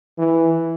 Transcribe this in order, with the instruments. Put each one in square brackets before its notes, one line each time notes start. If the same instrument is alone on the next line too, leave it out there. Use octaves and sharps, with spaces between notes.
[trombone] E3